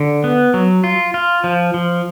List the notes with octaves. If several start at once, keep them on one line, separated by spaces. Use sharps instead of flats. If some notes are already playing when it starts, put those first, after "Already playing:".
Already playing: D3
B3
F#3
F4
F4
F3
F3